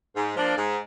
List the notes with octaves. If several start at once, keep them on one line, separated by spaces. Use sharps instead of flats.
G#2
F3 A#3 D4
G#2